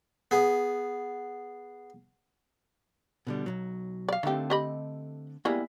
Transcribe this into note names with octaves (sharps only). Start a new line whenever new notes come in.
B3 G#4
B2 D3 G3
B1 F#2 F#3
D5 F5
D3 D#3 A3 C4 G4
G4 D#5 B5
G3 G#3 A#3 B3 E4 G#5